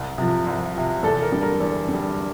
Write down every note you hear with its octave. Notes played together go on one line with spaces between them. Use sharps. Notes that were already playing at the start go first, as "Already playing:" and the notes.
Already playing: C2
C3 F3
C2
C3 F3
E2 A4
A#4
D3 G3
A#4
E2
D3 G3